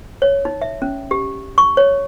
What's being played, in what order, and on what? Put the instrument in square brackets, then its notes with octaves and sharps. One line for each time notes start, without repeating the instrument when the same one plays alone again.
[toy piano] C#5
D#4
E5
C#4
G4
C#6
C#5